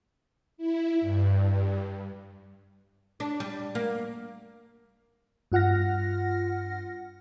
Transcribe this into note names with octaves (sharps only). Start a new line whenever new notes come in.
E4
G2
D4
G3
A#3
G2 F4 F#5 F6 A#6